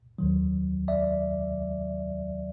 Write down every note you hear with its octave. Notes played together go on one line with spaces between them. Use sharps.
D#2 D#3 F#3
D5 E5